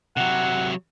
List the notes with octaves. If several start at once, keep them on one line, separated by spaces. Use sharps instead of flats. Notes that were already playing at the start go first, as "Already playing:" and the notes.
C3 F#3 F#5